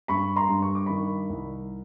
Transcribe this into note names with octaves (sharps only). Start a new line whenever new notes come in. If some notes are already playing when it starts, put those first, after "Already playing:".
G2 B5 C#6
A#5 C6
G2
C#6
D6
D#3 B5 C#6
C2